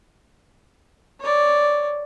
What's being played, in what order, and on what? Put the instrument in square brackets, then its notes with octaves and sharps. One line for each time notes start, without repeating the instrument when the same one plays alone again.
[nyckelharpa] C#5 D5